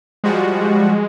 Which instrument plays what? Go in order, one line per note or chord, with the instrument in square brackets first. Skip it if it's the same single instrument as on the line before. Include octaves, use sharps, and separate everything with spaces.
[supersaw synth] F3 G3 F#4 [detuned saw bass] G#3